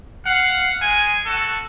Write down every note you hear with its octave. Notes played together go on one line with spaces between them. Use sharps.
F5 F#5
G#3 G#5
F#4 A4